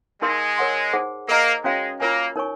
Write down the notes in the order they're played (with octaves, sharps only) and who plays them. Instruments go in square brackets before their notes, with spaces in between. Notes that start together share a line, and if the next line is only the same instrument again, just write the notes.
[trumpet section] G#3 [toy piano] D#4 A#4 F5 C6
[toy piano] A#4 C#5 F#5 C6
D#4 G#4 C5 F#5
[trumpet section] A#3 [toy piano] A#4 D#5 A#5
[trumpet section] G#3 [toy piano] C#4 F#4 C#5 F5
[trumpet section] A#3 [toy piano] F4 A#4 C#5 G#5
[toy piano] D#4 A#4 C#5 G#5 C#6